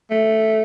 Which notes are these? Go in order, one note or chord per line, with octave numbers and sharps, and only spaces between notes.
A3